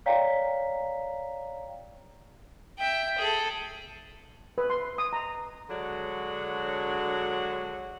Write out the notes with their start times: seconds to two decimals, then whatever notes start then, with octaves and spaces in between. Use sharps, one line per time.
0.06 C#5 D5 F5 G5 A#5 B6
2.79 E5 G5
3.18 G#4 A4
4.58 B4
4.70 C6
4.98 D#6
5.13 A#5
5.70 D3 F#3 G#3 D4 F#4 C#5